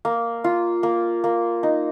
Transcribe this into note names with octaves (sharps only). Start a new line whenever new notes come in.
A#3
F4
A#3
A#3
D#4